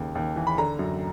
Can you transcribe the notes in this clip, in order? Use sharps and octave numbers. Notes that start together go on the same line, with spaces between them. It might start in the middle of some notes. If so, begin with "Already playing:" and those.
Already playing: D#2 C#3
D#2
E3
B5
D3 A#5
F#2